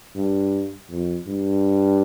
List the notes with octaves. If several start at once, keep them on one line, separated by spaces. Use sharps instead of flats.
G2
F2
G2